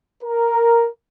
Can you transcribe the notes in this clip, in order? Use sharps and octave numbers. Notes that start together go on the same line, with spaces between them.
A#4